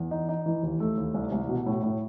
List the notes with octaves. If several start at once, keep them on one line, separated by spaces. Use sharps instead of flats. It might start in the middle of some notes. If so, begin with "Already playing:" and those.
Already playing: E2
D#4
D#4
E3
D#2
A3
D#2
C2
C2
B2
A2
A2